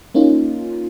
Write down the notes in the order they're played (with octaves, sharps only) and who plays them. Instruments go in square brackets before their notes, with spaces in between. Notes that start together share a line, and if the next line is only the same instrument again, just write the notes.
[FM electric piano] A#3 C#4 D#4 F4